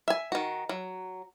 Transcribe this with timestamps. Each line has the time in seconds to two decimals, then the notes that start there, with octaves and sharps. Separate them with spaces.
0.08 E5 G#5
0.32 D#3 F#4
0.69 F#3